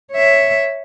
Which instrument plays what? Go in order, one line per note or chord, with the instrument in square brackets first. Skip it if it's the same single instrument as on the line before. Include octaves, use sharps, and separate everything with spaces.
[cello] C#5 E5